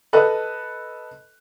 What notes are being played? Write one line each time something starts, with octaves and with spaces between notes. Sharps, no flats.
A4 B4 D#5 F#6